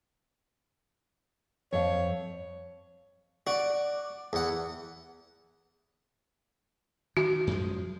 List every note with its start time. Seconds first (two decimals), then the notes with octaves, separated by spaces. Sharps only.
1.73 F2 C#5 F5
3.47 F#4 D5
4.33 E2 F#5
7.17 D#3 F#4
7.47 F#2 F3 G#3